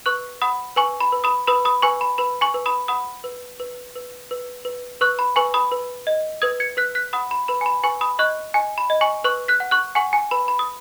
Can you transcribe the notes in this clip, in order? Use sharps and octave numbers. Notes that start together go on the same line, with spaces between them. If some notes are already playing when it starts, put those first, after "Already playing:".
B4 C#6 F#6
F#5 B5 D#6
B4 G#5 C#6
B5
B4
B5 D#6
B4 B5 D#6
B5 D#6
B4 G#5 C#6
B5
B4 B5
G#5 C#6
B4
B5 D#6
F#5 B5 D#6
B4
B4
B4
B4
B4
B4 C#6 F#6
B5
B4 G#5 C#6
B5 D#6
B4
D#5
B4 D#6 G#6
G#6 C#7
B4 F#6 B6
F#6 B6
F#5 B5 D#6
B5
B4 B5
G#5
B5
B4 G#5 C#6
B5 D#6
D#5 C#6 F#6
D#5 G#5
B5
D#5
G#5 C#6
B4 C#6 F#6
F#6 B6
F#5
C#6 F#6
F#5 G#5 C#6
G#5
B4 B5
B5
D#6